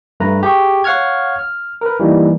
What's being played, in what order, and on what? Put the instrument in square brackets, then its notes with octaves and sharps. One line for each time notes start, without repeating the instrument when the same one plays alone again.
[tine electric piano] G2 A3 B4 A#5
G4 G#4 C#6
C#5 F5 F#5 C#6 F6 G#6
F6
A#4 B4
E3 G3 A#3 D#4